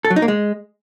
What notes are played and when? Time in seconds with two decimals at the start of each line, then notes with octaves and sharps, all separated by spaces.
0.05 A4
0.10 F#3
0.16 D#4
0.22 A#3
0.28 G#3